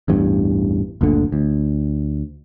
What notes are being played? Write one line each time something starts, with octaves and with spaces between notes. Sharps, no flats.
A1 E2 G2
F#1 D2 A#2 D3
D2